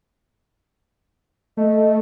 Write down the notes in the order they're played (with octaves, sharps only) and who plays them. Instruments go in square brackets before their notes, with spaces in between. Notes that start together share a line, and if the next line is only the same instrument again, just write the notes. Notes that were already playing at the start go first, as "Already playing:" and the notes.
[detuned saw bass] A3 [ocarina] D#5